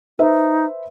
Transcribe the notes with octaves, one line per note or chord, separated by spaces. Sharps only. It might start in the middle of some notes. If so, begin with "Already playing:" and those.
D#4 B4 C5 E5